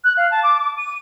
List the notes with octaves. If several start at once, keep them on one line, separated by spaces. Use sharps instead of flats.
F#6
F5
A5
D6
D6
D#7